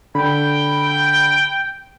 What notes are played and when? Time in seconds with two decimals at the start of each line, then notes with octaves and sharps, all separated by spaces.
0.15 D3 G5 B5